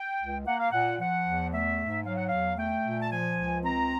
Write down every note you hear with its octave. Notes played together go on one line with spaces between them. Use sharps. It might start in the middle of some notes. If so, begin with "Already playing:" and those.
Already playing: G5
C#2
A#3 F#5
F5
A#2 F#5
F3 F#5
E2
A3 E5
G#2
F#3 F5
F#5
E2 F5
A3 G5
A#2
A5
F3 G#5
C#2
C4 A#5